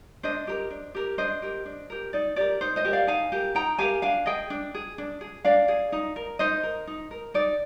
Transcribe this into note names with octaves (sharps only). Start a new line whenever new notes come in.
D4 C5 D#5
G4 A#4
D4
G4 A#4
D4 C5 D#5
G4 A#4
D4
G4 A#4
D#4 D5
G4 A#4 D5
D#4 C5
C5 D#5
G4 A#4
D5 F5
D#4 F5 G#5
G4 A#4
D#4 G5 A#5
G4 A#4 F5 G#5
D4 F5 G#5
G#4 D#5 G5
D4
G#4
D4
G#4
D4 D5 F5
G#4
D#4
A#4
D#4 C5 D#5
A#4
D#4
A#4
D#4 D5